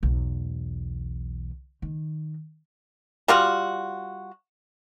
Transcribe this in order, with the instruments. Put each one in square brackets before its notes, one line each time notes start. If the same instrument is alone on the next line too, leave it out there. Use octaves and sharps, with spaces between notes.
[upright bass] B1 E2
D#3
[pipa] G3 F4 F#4